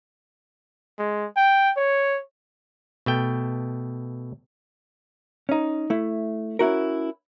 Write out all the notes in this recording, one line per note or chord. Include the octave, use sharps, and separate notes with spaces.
G#3
G5
C#5
B2 A3 G5
C#4 D#4
A3 E4
C#4 E4 F#4 A#4